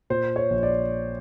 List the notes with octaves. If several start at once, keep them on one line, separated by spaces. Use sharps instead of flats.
A#2 C5
C#5
A#1
D5